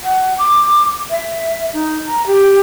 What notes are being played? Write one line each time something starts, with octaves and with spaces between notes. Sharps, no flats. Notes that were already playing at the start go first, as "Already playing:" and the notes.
F#5
D6
E5
D#4
A#5
G4